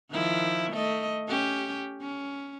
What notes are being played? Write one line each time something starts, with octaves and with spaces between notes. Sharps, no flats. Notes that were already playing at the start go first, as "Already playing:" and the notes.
D#3 F3 E4
A3 D#5
C#4 G4
C#4